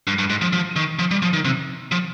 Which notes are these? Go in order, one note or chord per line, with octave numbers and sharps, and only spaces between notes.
G2
G2
G#2
F3
F3
D#3
F3
G3
F3
D#3
C3
F3